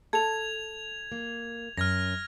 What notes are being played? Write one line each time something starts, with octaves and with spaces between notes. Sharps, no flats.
A4 G#6 F7
A#3
F#2 F6 G#6 A#6